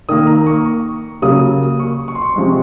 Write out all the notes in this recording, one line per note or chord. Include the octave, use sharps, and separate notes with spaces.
D#3 A#3 D#6
A#5
C#6
C#3 F#3 A#3 D#6
C#6
C#6
C6
C#6
C3 F3 G#3